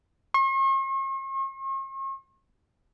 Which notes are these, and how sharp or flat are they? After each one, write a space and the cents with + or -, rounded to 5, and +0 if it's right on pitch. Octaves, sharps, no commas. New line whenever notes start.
C#6 -45